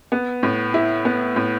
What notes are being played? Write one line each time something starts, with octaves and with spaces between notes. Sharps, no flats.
B3
A2
E4
B3
A2